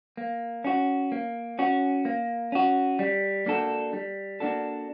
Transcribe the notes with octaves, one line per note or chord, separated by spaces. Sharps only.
A#3
C#4 F#4
A#3
C#4 F#4
A#3
C#4 F#4
G3
A#3 D4 F#4 A4
G3
A#3 D4 F#4 A4